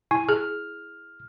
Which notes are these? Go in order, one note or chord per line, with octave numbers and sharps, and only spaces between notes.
E4 G#5
G#4 F6